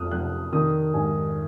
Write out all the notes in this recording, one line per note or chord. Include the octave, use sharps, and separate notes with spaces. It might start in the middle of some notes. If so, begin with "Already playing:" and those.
Already playing: F1 F2 D#6 F6 F#6
F1 F#6
D#3 D#6
G#2 G#5